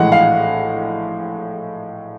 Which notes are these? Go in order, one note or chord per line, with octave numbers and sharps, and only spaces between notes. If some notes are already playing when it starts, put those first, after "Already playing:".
Already playing: A#1 A2 E3 G#3 F#5
F5